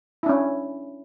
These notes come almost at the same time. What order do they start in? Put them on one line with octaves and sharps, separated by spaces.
E4 D4 C#4